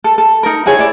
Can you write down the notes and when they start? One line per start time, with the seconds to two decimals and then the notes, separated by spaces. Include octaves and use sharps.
0.04 A4
0.18 A4
0.43 D#4 A#4
0.66 E4 F#4 G#4 C#5
0.79 E4 D5